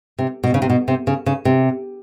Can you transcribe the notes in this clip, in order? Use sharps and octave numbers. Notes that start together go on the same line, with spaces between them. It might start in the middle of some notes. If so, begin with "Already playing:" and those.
C3
B2
C#3
C3
B2
C3
C#3
C#3
C3